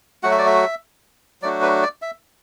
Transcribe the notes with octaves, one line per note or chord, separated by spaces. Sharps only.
F#3 A3 F#4 F#5
E5
D5
E5
F#3 A3 D4 F#4 D5
B4
D5
E5